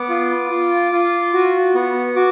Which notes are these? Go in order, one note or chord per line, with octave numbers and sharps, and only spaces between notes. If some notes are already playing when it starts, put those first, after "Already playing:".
Already playing: B3 D6
F4
F4
F4
F#4
B3
F#4 D6